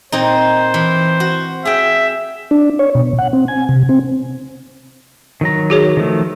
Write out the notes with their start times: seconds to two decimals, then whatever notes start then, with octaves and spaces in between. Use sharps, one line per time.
0.12 A#2 C4 D#4 C5
0.74 E3
1.20 F#4
1.65 G#4 E5 G5
2.51 D4
2.79 C#5
2.95 B2
3.18 F#5
3.33 C4
3.48 G#5
3.69 C3
3.89 C4
5.41 D#3 F#3 A#5
5.70 F#4 G#4 C#5
5.97 D#3 F3 A3